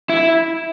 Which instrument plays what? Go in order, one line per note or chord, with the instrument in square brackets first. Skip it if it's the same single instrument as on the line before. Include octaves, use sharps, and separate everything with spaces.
[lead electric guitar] E4